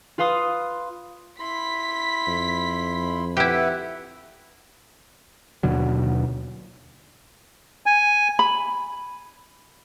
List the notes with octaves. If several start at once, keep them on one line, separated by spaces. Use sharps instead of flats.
F4 B4 F5 C6 D#6
E4 B5 C6 B6
F2
E4 G4 B4 E5 F#5
D#2 B2 D3 F#3
G#5
B5